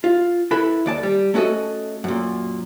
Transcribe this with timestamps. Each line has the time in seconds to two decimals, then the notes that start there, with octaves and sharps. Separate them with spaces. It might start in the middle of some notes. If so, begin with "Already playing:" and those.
0.04 F4
0.51 E4 A4 B4 E5 B5
0.86 D#2 D5 A5
1.03 G3
1.34 A3 C#4 F#4 A4 D#5
2.04 F#2 A#2